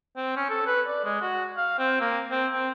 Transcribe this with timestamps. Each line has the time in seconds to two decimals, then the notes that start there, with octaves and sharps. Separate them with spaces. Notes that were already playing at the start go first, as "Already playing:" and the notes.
0.16 C4
0.36 C#4
0.49 A4
0.66 B4
0.87 D5
1.04 G#3
1.22 F#4
1.57 F5
1.78 C4
2.01 A#3
2.31 C4
2.52 C4